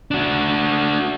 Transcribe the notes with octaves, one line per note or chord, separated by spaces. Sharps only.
D4 F#4